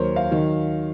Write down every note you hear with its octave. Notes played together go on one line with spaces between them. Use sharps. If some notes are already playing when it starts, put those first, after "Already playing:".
Already playing: D#2 D#3 F#3 A#4 C5 C#5
F5
D#3 F#3